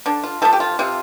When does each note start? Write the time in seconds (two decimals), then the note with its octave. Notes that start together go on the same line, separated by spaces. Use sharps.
0.06 D3 D4
0.24 F4
0.42 F3 A3 A4
0.53 G4
0.60 F4
0.79 C3 F4